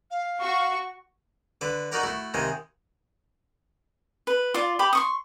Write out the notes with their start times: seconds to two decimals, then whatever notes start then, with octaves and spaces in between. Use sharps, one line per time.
0.10 F5
0.40 F#4 C#6
1.61 D3 B4 D6
1.92 D#4 F#4 A#4 D5 F#5 A#5
2.03 A3 E4 F#4
2.34 D#2 C3 D#3 G#3 G#4 D#5
4.27 B4
4.54 F4 D5
4.79 G4 B5 D6
4.93 C6 C#6 D#6